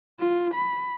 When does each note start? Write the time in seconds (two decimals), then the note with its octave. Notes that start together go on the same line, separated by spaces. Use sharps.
0.20 F4
0.55 B5